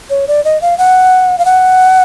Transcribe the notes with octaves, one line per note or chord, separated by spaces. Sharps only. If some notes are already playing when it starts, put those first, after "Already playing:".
C#5
D5
D#5
F5
F#5
F5
F#5